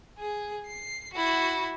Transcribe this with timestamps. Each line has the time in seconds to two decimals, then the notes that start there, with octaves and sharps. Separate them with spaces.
0.18 G#4
0.66 C7
1.13 E4 F#4